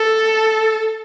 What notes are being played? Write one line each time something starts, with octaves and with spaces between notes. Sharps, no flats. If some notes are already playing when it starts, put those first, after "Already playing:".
Already playing: A4